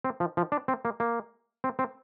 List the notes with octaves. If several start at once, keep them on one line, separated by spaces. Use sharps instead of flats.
C4
F3
F3
D4
C4
A#3
A#3
C4
C4